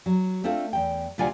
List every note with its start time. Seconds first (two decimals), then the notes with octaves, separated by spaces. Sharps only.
0.06 F#3
0.44 A3 C4 D4 F4 A4
0.73 E2 G5
1.18 D2 C3 F4 D5 F#5 G#5